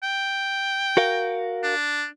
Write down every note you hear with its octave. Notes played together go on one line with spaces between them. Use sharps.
G5
F#4 A#4 F5
D4